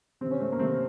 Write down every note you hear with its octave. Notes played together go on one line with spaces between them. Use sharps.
C3 D#3 C4
C#4
A3 C4
A#3
C3 D#3 A3 C4